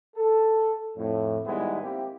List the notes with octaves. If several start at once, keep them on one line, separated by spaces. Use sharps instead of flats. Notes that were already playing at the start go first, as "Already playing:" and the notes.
A4
F2 A2
G#2 D#3 G3 G#3 B3 E4
A#3 C4 E4 G4